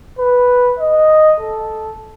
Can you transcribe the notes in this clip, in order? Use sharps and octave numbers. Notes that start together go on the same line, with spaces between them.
B4
D#5
A4